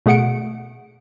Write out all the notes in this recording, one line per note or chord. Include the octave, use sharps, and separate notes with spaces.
B2 A3 G#4 F#5 C#7 D7